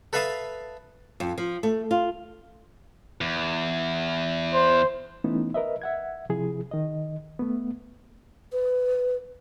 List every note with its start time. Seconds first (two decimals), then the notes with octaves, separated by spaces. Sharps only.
0.13 A4 B4 E5 F5 A5 D#6
1.20 F2
1.38 F3
1.63 A3
1.91 F4
3.21 E2
4.53 C5
5.24 E3 A3 B3 C#4 D#4 E4
5.54 A#4 B4 D#5 E5
5.82 E5 F#5 G#6
6.30 C3 F3 E4 G#4
6.71 D#3 D#5
7.39 A3 B3
8.52 B4